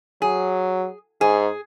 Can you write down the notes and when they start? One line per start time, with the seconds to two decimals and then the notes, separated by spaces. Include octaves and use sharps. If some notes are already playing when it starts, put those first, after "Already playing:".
0.22 F#3 G#4
1.21 G#2 G#4